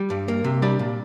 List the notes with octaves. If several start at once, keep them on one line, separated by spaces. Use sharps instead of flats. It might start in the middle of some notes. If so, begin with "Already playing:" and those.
Already playing: G3
G2
A#3
C3
G3 D4 D5
A#2